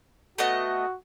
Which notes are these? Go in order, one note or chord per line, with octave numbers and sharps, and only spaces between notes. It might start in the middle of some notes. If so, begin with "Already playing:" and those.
A3 B3 F#4 D#5